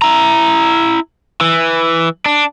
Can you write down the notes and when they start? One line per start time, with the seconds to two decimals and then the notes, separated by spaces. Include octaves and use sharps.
0.02 E4 A#5
1.41 E3
2.26 D4